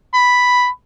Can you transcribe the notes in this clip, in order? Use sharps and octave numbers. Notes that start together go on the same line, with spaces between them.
B5